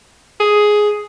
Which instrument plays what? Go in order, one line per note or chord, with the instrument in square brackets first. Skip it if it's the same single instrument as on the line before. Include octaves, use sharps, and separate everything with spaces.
[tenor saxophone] G#4